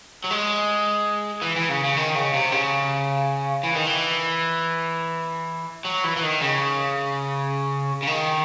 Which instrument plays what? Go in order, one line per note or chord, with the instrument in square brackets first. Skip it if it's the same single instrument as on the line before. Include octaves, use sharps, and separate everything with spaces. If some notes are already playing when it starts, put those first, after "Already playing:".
[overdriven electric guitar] F#3
G#3
E3
E3
C#3
C#3
D#3
C#3
C3
C#3
E3
D#3
E3
F#3
E3
E3
D#3
C#3
C#3
D#3